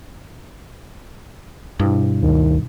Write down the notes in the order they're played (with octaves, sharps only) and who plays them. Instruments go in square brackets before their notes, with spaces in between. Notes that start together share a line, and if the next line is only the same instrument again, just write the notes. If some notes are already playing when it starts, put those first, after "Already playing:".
[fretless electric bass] G2 [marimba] B2 D4 E4
[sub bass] D2 [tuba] D#3